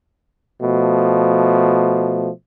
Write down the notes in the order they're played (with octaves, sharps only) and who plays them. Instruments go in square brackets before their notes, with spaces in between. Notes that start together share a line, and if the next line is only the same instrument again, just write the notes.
[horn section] B2 F3 A3